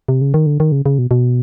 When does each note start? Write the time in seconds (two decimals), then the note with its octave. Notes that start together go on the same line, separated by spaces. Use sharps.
0.08 C3
0.21 C#3
0.34 D#3
0.46 D3
0.60 D#3
0.72 C#3
0.86 C#3
0.98 B2
1.11 B2